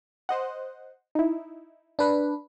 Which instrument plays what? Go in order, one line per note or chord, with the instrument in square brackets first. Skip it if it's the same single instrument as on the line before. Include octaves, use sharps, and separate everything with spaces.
[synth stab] C5 D#5 F#5
D#4 E4
[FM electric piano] D4 B4